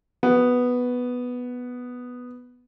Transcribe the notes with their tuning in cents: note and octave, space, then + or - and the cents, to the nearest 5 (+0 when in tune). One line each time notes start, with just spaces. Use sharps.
B3 +0 F#4 +0